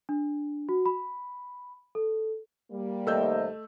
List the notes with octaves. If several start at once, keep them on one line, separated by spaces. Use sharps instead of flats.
D4
F#4
B5
A4
G3 A#3
D#2 C3 A3 D#5 E6 G6